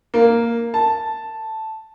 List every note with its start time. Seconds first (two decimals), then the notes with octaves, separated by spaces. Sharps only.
0.14 A#3
0.74 A5